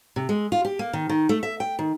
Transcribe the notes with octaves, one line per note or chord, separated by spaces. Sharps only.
C3
G#3
F4
G4
A#3
D#3
D#3
A3
E5
G5
D#3